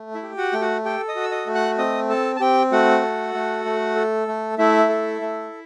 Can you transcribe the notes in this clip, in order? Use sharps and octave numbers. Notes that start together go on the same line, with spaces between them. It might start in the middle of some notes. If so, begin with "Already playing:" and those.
Already playing: A3
E4 E5
G4
F#4 F#5
A3 G5
F#4 F#5
G4 A4 G5
D#5 D#6
F#4
E6
D#5 D#6
A3
F#5 F#6
C4 D#5 D#6
A4 A5
A5
C4 G4 G5
A3 F#4 F#5
A4
A3
A3
A4
A3
A3 E4 E5
A4
A3